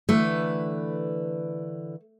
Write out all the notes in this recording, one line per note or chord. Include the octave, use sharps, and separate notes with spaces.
D3 E3 A3 B4